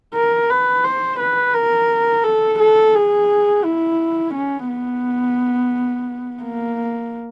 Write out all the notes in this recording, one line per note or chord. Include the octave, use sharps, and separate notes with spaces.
A#4
B4
C5
B4
A#4
A4
A4
G#4
E4
C#4
B3
A#3